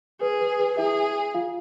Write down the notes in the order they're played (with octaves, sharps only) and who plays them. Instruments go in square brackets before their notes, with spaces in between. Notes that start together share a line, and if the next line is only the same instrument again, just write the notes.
[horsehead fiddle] G#4 [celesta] B4
[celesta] B4
B4
[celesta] E4 E5 [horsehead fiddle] G#4
[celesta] F4 F5